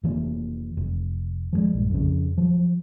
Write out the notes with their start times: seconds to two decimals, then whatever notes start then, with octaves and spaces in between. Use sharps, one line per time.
0.03 F1 E3 A#3
0.77 F1
1.53 F3 F#3 G#3
1.73 A#1 G2
1.91 F2 C#3
2.38 F3 F#3